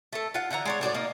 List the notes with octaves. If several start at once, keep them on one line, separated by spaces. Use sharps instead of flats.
A3 A4
F4 F#5
D3 E3 F#5 A#5
G#3 D4 C#5
A2 F#4 G4 D5
A#3 D#4